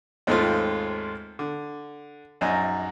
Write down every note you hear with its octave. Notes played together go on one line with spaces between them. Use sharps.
D#2 G#2 A3 C4 F4
D3
A#1 F#2 D#4 G#5